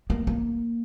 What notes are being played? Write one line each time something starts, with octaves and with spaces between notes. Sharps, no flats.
A#3
A#3